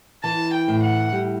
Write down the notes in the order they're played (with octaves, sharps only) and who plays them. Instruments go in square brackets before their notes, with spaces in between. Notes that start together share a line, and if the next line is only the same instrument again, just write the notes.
[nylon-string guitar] E3 [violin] A5
[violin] G5
[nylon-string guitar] A2
[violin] F#5
[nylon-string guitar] G3